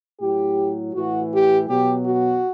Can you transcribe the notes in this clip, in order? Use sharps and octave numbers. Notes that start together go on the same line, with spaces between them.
A2 F#3 G4
A2 E3 F#4
G4
B2 F#3 G4
F#4